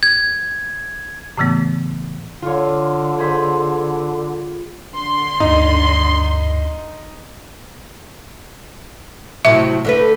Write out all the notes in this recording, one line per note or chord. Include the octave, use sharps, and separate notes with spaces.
G#6
A2 C#3 E3 A3 B3
D3 F4 C#5
G#4 C5 B5
D3 C6
D2 G2 D#4
A2 C3 F#3 E5
D3 A3 B4